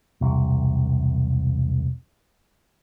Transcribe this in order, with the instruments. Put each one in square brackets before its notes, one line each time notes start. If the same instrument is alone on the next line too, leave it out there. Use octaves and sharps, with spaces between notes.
[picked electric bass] E1 C2